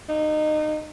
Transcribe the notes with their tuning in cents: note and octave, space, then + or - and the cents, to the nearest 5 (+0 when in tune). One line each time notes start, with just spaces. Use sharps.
D#4 -25